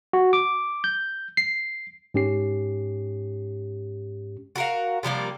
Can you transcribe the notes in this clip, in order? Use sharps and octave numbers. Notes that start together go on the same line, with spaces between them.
F#4
D6
G6
C7
G#2 C#4 G4 C7
F#4 A#4 F5
C3 F3 G3 A#3